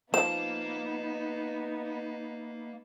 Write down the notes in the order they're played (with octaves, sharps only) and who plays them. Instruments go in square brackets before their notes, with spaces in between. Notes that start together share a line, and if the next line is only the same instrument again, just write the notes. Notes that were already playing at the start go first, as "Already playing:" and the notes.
[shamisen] F3 [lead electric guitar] A#3 F5 [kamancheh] B3 D#4 [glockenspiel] E7